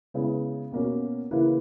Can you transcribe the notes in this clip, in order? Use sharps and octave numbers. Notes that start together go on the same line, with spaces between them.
C#3 G#3 B3 E4 G#4
B2 A#3 C#4 F#4
C#3 E3 A#3 E4 B4